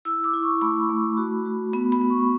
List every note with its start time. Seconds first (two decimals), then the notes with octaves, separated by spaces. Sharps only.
0.05 E4 E6
0.24 D6
0.34 E4
0.43 C#6
0.62 A3 B5
0.90 A3
1.17 F#4
1.45 F#4
1.73 B3 B5
1.92 B5
2.01 B3
2.10 C#6